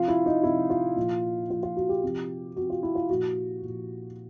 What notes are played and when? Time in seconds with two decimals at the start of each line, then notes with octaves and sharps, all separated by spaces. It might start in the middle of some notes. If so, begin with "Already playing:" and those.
Already playing: C3 F3 F4
0.08 E4
0.26 D#4
0.43 C3 F3 E4
0.70 F4
0.96 A#2 F3
1.50 A#2 F3 F4
1.63 F4
1.77 F#4
1.89 G4
2.03 C3 F3
2.56 C3 F3 F#4
2.70 F4
2.83 E4
2.95 F4
3.09 A#2 F3 F#4
3.62 A#2 F3